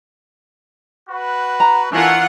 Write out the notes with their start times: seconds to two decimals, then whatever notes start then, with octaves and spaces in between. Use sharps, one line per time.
1.10 F#4 B4
1.60 A#5
1.92 E3 A3 D4 E4 F4 A#4 F#5 G#5